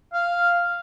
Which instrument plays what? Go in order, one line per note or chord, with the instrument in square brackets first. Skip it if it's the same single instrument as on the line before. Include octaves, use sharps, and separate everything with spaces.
[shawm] F5